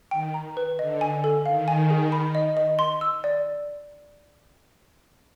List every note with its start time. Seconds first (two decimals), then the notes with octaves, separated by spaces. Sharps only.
0.11 D#3 G5
0.34 A#5
0.57 B4
0.79 D3 D#5
1.01 G#5
1.24 A4
1.46 D#3 F5
1.68 G#5
1.90 G#4
2.12 B5
2.35 D#5
2.57 D#5
2.79 C6
3.01 E6
3.24 D5